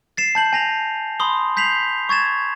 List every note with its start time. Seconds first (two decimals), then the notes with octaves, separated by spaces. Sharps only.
0.17 A6 C7 E7
0.35 A5 G6 F#7
0.53 G#5 A#6 F7
1.20 B5 C6 D#6 G7
1.57 G6 B6 C7 F7 F#7
2.09 C#6 G#6 A6 E7